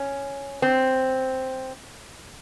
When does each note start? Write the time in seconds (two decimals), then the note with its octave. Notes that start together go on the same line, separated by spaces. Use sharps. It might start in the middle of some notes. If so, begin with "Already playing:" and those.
Already playing: C#4
0.62 C4